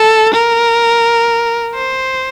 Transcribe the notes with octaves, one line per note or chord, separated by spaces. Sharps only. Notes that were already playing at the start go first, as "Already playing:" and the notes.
Already playing: A4
A#4
C5